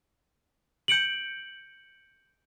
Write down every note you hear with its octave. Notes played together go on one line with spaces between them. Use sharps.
G6 C#7 D7 F#7